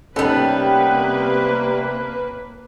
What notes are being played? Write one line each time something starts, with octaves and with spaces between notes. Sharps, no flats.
C3 G3 A#3 B3 C#4 D#4 A4 B4